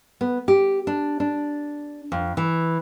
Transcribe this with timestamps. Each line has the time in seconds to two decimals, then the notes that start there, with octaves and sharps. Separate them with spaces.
0.21 B3
0.48 G4
0.87 D4
1.20 D4
2.12 F2
2.37 E3